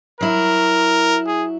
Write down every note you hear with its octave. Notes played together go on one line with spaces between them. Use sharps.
F#3 E4 A#4
G#4